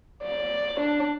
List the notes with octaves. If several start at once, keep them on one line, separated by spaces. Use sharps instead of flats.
D5
D4